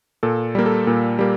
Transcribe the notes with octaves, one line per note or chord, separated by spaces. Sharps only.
A#2 A4
G3 A#3
A4
A#2
G3 A#3